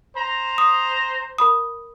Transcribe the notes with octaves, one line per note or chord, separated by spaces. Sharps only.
C5 A#5
D#6
A#4 B5 D#6